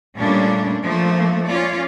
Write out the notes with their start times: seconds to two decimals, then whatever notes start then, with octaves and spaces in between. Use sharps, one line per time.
0.17 A#2 G3 A3 A#3 C#4 D4
0.82 F3 A3 A#3
1.47 C#4 F4 D5